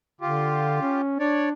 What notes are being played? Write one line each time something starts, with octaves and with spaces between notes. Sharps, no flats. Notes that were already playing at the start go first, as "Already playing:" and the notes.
D3 F4 G4
C#4
D4 C#5 D5